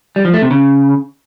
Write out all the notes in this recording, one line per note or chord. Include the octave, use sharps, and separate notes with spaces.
G3
F3
A3
C3
C#3